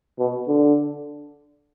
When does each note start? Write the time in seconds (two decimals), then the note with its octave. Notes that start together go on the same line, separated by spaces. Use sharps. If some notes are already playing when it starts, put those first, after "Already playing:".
0.19 B2
0.48 D3